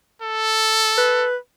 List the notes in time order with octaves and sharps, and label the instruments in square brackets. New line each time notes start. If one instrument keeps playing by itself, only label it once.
[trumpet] A4
[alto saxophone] B4